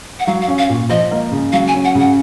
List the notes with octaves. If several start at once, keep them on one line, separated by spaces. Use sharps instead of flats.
F#5
F#3 F5
F5
C#4
F5
A#2
F3 D#5
A#3
C#3
F#3 F5
G#5
C#4
F#5
C#3
F#5